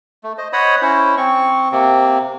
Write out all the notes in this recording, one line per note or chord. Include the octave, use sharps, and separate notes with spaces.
A3
C5 D#5
C5 C#5 D#5 F#5 B5 D#6
C#4 E4 C5
C4 C#6
C3 A#3 C4